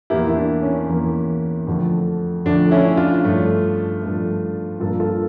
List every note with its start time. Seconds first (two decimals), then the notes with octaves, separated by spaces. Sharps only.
0.10 E2 E3 A#3 E4 G4
0.29 E4
0.36 D4
0.62 C#4
0.89 E2 E3 A#3
1.67 F2 D3 F3 A3
2.45 F2 D3 F3 A3 D4
2.71 C#4 E4
2.97 D4 F4
3.24 G2 F3 A3
4.02 G2 F3 A3
4.80 G2 F3 A#3 F4 A4
5.00 F4 A4